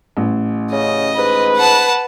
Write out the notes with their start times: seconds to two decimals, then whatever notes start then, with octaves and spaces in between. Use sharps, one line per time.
0.17 A1
0.72 C#3 D#5
1.17 G#2 B4
1.57 F#5 A5